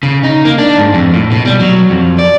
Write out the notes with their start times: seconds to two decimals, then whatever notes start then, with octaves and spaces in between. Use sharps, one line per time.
0.03 C#3
0.24 D#4
0.45 A#3
0.58 D4
0.78 G#2
0.94 F2
1.14 A2
1.31 B2
1.45 G3
1.60 F#3
1.90 F2
2.19 D5